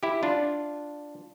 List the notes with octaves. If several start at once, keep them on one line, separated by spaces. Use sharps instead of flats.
E4 G4
D4 F4